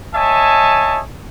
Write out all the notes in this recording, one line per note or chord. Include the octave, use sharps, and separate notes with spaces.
C#5 D#5 E5 G#5 A5